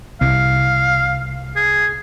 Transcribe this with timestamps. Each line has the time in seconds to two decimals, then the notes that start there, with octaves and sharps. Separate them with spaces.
0.21 C2 F5
1.56 G#4